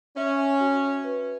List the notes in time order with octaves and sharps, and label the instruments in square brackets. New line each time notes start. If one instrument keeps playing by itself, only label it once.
[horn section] C#4 [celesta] E5
[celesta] F#4
B4